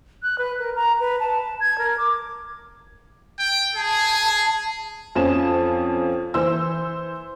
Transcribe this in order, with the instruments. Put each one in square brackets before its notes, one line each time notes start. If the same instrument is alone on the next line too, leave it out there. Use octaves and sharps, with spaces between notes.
[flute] F#6
B4
A#4
A#5
B4
A5
G#6
A#4
D6
[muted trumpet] G5
[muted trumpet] G#4 [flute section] A5
[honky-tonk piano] F2 F3 C#4 A5 E7
E3 C5 E6